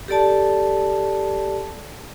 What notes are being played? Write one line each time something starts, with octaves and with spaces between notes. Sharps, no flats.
G4 A4 D5 A5